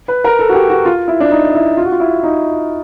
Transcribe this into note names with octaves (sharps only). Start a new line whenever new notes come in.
B4
A#4
A4
F#4
G4
F#4
F4
E4
D4
D#4
E4
F4
F#4
F4
E4
D#4